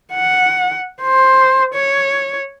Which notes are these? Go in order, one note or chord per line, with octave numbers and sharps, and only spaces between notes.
F#5
C5
C#5